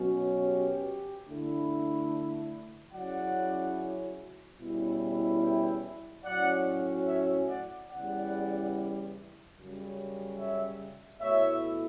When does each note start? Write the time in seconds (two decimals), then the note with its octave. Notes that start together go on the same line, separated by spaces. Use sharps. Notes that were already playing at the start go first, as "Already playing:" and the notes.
Already playing: B2 F#3 C#4
0.44 G4
1.27 D3 A3 E4
2.92 C#3 F#3 C#4 E4 D5 F#5
4.58 E2 B2 G3 C#4 E4
5.41 E5 G5
6.24 A2 F#3 C#4 D5 F#5
7.06 C#5 E5
7.48 D5 F#5
7.89 E2 C#3 E3 G3 D5 F#5
9.56 F#2 C#3 G3
10.38 C#5 E5
11.21 B2 A3 E4 C#5 E5